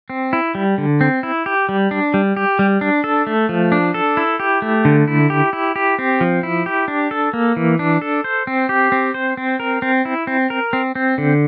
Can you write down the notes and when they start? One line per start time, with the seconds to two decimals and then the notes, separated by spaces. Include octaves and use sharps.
0.10 C4
0.33 E4
0.55 G3
0.78 D3
1.01 C4
1.23 E4
1.46 G4
1.69 G3
1.91 D4
2.14 G3
2.37 G4
2.59 G3
2.81 D4
3.04 A4
3.27 A3
3.49 F3
3.72 D4
3.94 A4
4.17 E4
4.40 G4
4.62 A3
4.85 D3
5.08 E4
5.30 G4
5.53 E4
5.76 G4
5.99 C4
6.21 F3
6.43 E4
6.66 G4
6.88 D4
7.11 A4
7.33 A#3
7.57 E3
7.79 D4
8.01 A4
8.24 C5
8.47 C4
8.69 G4
8.92 C4
9.14 C5
9.37 C4
9.60 A#4
9.82 C4
10.05 E4
10.27 C4
10.50 A#4
10.73 C4
10.95 C4
11.18 D3